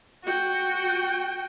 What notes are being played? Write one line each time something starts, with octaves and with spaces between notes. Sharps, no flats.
F#4 G5